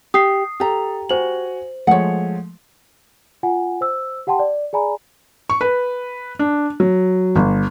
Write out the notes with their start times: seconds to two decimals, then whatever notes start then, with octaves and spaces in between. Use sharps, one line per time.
0.14 G4 D#6 C7
0.60 G4 A4 A#5
1.09 F#4 C5 G#5 F#7
1.87 F3 G#3 A3 C#5 F#5
3.43 F4 F#5 G#5
3.81 C5 E6
4.27 G4 F#5 G5 A5 C6
4.39 D5
4.73 G#4 D5 G#5 A#5 B5
5.50 C#6
5.61 B4
6.39 D4
6.80 F#3
7.36 G1